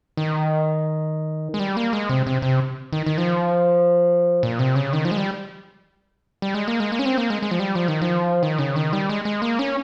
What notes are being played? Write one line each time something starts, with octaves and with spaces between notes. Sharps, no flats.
D#3
G#3
G3
A#3
G#3
C3
C3
C3
D#3
D#3
F3
A#2
C3
C#3
D#3
F3
G#3
G3
G3
G#3
A#3
G#3
A#3
C#4
C4
A#3
G#3
G#3
F3
G3
F3
D#3
F3
D#3
C#3
D#3
G3
G#3
G#3
A#3
C#4